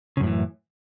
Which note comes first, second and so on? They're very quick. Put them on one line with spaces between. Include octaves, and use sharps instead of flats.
C#3 F#2 A2 E3